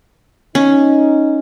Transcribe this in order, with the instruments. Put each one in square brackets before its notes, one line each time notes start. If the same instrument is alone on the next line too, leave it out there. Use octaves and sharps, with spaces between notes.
[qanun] C#4 [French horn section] D#4